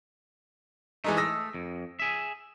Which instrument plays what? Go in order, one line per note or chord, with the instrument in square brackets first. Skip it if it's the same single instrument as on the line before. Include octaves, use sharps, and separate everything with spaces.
[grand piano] E3 G#3 D#4 [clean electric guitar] A3
[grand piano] D#6 E6 A#6
[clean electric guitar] F2
G#4 E5